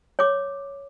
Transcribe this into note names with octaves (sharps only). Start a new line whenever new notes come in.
C#5 D6